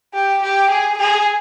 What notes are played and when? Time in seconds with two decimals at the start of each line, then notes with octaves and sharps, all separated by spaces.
0.14 G4
0.42 G4
0.70 G#4
0.98 G#4